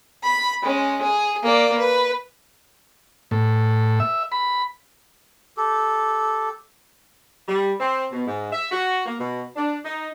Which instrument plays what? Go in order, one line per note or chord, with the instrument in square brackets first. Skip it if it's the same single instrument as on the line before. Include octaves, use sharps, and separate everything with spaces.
[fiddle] B5
G#3 C#4
G#4
A#3 D5
B4
[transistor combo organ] A2
E5
B5
[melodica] G4 A4
[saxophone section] G3
C4
B2
G#2
E5
F#4
A#3
B2
D4
D#4